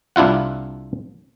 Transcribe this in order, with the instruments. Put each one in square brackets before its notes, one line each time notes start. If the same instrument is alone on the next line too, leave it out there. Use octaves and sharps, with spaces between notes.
[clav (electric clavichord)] C2 D4 E4 F4 F#5